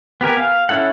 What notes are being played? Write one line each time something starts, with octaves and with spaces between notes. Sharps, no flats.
B3 G4 A#4 G#5
F5
C#4 E4 A4 F#5